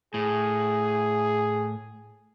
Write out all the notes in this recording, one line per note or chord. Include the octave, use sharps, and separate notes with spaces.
A2 G#4